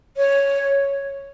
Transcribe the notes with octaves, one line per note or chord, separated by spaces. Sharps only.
C#5